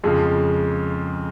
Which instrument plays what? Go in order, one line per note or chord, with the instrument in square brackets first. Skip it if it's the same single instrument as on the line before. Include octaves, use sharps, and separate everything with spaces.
[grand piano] F2 C#3 F3 G#3